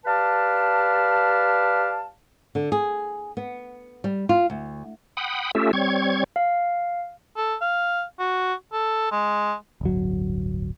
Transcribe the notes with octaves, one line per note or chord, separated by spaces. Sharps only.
G4 B4 D5 F5 A5
D3
G#4
B3
G3
F4
D2
F#5 G5 B5 D#6
A3 C#4 F4 G4 A4 E5
G3 C4 C#5 C#6 G#6
F5
A4
F5
F#4
A4
G#3
D1 G1 F#3